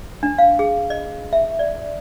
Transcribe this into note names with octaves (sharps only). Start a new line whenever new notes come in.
D4
F5
G#4
D#5
E5
D5